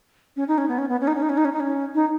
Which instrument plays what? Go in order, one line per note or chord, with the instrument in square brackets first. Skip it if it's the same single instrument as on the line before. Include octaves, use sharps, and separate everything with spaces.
[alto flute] C#4
D#4
C#4
B3
C#4
B3
C#4
D#4
C#4
D#4
C#4
D#4
C#4
D#4
C#4
D#4